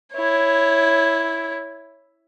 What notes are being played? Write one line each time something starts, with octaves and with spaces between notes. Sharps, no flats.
E4 C#5